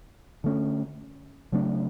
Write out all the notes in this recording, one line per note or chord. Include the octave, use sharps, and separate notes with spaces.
D3 A3 C#4
C#3 F#3 A3 D4